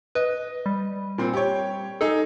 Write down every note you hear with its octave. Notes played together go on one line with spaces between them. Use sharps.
B4 D#5
G3
A#2 C4
G4 C#5
D#4 G#4 A4